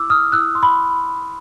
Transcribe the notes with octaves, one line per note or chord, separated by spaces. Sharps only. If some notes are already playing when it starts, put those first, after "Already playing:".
Already playing: E4 D6 E6
D#6 F6
E4 E6 F#6
C6
B5